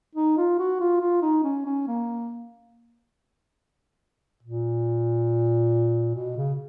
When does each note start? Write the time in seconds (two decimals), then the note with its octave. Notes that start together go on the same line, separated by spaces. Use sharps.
0.15 D#4
0.37 F4
0.59 F#4
0.80 F4
1.01 F4
1.22 D#4
1.43 C#4
1.66 C#4
1.87 A#3
4.43 A#2
6.15 B2
6.37 C#3